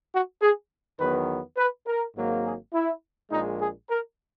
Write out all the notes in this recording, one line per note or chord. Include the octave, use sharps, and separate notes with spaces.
F#4
G#4
E2 D#3 F#3 B3 B4
B4
A#4
G#1 G#2 F#3 A#3
G#4
E4
A#1 A#2 G#3 D#4
G#4
A#4